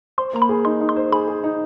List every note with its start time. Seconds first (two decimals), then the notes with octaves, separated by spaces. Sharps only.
0.18 C5 C6
0.33 A#3 A#5
0.42 B5
0.49 G#4
0.65 D#4 C6
0.81 D#4
0.89 C6
0.96 C5
1.12 G#4 B5
1.28 G#4
1.44 D#4